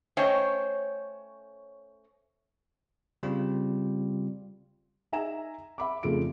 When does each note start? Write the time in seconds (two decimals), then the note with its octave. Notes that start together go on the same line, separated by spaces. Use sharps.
0.17 A3 C#4 C5 C#5 D#5 G5
3.23 C#3 G3 C4 F4
5.12 D#4 E5 G#5 A#5 E7
5.78 E5 B5 D6
6.03 F1 C#3 A3 F4 D7